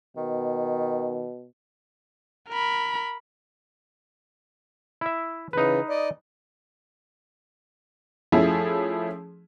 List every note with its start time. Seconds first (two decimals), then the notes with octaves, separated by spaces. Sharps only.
0.17 B2 D#3
2.49 A#4 B5
5.01 E4 E5
5.53 C#3 E3 D#4 B4
5.90 D5 D#5
8.32 F3 A3 C#4 E4 G#4